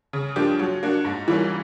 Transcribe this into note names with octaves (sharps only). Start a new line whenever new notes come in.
C#3
F3 A#3 D4 G4
F#3
A#3 D4 F#4
G#2
E3 G3 A#3 C#4